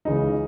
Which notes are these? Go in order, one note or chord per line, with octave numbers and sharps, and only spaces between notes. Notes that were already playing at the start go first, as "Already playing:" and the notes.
C#2 C#3 E3 D#4